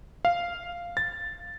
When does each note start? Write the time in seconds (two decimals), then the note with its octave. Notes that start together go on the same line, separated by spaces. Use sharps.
0.25 F5
0.97 A6